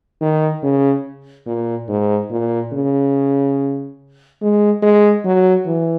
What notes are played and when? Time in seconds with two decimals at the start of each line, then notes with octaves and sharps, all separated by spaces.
0.21 D#3
0.63 C#3
1.47 A#2
1.88 G#2
2.31 A#2
2.73 C#3
4.42 G#3
4.83 G#3
5.25 F#3
5.67 E3